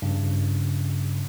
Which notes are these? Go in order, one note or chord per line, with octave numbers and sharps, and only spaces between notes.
G2 C#3